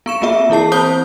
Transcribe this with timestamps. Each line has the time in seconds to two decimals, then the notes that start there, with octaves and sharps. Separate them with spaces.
0.06 B3 C#6 E7
0.22 A#3 C4 F4 E5
0.50 E3 E4 G#4 A5 C7
0.72 C4 C5 A5 D#6 G6 G7